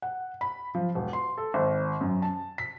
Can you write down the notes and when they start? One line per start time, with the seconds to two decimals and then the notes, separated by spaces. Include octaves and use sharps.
0.02 F#5
0.41 B5
0.75 F3
0.95 E1
1.13 C6
1.38 A4
1.54 G#1
2.01 F#2
2.22 A5
2.58 B6